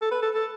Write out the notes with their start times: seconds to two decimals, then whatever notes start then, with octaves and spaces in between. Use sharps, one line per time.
0.02 A4
0.11 B4
0.22 A4
0.35 A4